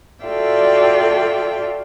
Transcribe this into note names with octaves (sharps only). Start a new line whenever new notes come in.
F4 F#4 A4 D5 E5 G5